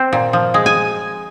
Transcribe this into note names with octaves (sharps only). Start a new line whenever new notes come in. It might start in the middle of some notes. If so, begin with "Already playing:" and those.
Already playing: C4
A#2
F3
G#3
G#5